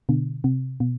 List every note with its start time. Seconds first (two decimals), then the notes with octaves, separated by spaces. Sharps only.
0.09 B2 D3
0.44 C3
0.80 B2